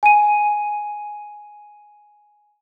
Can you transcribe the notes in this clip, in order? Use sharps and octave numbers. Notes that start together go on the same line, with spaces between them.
G#5 D#7